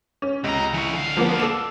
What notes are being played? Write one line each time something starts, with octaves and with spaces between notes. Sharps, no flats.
C#4
C#2 C3 A#5
E3 C#5
D3 F5
F3 A#3 B3
A4 D6 E7